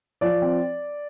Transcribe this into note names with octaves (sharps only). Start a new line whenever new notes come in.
F3 D5
C4